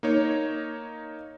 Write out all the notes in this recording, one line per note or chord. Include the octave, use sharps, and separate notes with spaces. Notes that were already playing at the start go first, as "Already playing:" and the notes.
A#3 D#4 C#5